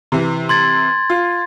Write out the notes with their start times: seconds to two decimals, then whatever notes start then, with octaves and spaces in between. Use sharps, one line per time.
0.12 C3 E3
0.49 C6 G#6 A6
1.10 F4